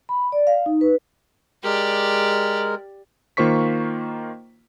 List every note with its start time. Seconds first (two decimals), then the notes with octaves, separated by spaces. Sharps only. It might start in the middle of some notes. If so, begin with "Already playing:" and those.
0.09 B5
0.32 D5
0.47 F5
0.66 D#4
0.81 B4
1.64 G#3 G4 A#4 D5
3.37 D#3 A#3 F4 C5 C#6 B6